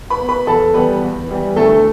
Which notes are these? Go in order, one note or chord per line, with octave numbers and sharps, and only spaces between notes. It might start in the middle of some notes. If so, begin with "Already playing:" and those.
B4 B5
B3
B4 B5
E2 A4 A5
E3 G3 B3 B4
E2
E3 G3 B3
D2 A3 A4